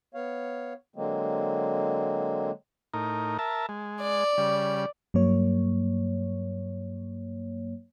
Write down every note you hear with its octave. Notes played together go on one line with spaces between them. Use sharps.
B3 C#5 F5
D3 F#3 G#3 A#3 C4
A2 D#4 A#4
A#4 E5 A5
G#3
D5
C#3 G3
G2 F#3 A#3 C#5